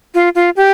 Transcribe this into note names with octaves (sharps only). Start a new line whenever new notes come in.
F4
F4
G4